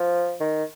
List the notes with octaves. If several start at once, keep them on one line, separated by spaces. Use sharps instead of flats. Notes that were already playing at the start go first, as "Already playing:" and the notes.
Already playing: F3
D#3